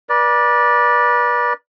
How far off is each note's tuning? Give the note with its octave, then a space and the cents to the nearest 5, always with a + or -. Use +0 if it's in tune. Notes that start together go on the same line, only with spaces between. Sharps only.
B4 -40 D5 +0